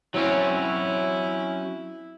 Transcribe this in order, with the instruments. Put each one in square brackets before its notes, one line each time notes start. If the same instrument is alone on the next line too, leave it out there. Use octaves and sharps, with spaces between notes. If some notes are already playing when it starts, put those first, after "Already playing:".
[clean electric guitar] F#3 C4 C#4 [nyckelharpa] E4